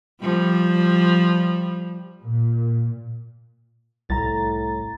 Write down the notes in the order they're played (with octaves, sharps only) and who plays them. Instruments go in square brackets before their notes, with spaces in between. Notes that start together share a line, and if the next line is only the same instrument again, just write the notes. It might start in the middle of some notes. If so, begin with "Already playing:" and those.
[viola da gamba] F3 G3
[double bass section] A#2
[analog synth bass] C2 [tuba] A2 [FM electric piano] A#5 A6